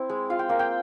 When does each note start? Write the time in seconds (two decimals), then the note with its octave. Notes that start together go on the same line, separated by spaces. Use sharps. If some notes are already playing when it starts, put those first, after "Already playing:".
Already playing: C4 E4
0.09 G#3
0.30 F4 F5
0.39 G5
0.49 A#3 F5
0.59 G5